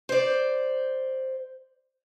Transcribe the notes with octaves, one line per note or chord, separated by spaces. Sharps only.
C5 D5